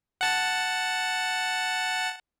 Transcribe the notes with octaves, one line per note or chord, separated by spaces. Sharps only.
F#5 A5 A6